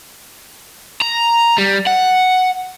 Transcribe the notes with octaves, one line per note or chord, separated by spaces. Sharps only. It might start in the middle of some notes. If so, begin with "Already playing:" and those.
A#5
G3
F#5